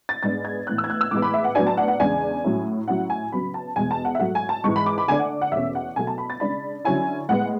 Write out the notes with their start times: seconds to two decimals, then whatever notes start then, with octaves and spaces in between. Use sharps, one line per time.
0.09 A6
0.23 G#2 G#3 B3 D4 A6
0.45 G#6
0.67 A2 E3 B3 F#6
0.78 E6
0.84 G#6
0.90 F#6
1.01 E6
1.11 A2 E3 G#3 B3 D6
1.22 B5
1.34 E5
1.44 F#5
1.55 A2 F#3 B3 D4 G#5
1.67 A5
1.77 F#5
1.88 F#5
2.00 E2 C#3 G#3 D4 G#5
2.44 A2 F#3 C#4 E4
2.88 A2 F#3 C#4 E4 F#5
3.10 G#5
3.32 C#3 F#3 B3 B5
3.54 A5
3.76 E2 B2 G#3 G#5
3.91 A5
4.05 F#5
4.15 E5
4.19 G#2 F#3 A3 F#5
4.35 G#5
4.49 A5
4.64 G#2 E3 G#3 C#6
4.76 B5
4.86 D6
4.98 B5
5.08 D3 A3 D4 G#5
5.19 F#5
5.42 F#5
5.52 E2 B2 A3 C#4 E5
5.75 F#5
5.96 B2 F#3 A3 G#5
6.07 A5
6.18 B5
6.30 A6
6.40 C#3 G#3 D4 B5
6.85 D3 F#3 C#4 E4 G#5
7.29 A2 G#3 B3 F#5